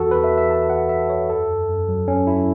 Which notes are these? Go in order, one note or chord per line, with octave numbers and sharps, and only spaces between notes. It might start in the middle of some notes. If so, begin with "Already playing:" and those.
Already playing: E2 E3 F#4 A4
E2 B4
E5
E3
E5
E2 A5
E2 F#5
E2 E5
E2 C#5
F#2 A4
F#2
F#2
F#3
F#3 C#4
F#3 E4